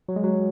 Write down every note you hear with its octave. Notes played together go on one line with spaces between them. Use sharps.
F#3
G#3
F#3